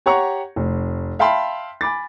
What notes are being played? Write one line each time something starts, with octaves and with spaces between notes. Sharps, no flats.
G4 C#5 F#5 A#5 C#6
F1
E5 F5 G5 A5 B5 C6
G#5 B5 D6 A6